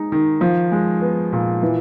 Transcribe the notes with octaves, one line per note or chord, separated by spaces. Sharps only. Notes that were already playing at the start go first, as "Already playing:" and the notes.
Already playing: G#3 D#4
D#3
F3
G#3
B3
A#2
E3